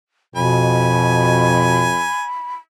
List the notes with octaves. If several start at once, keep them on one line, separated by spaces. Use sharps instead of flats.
F2 B2 G#5 B5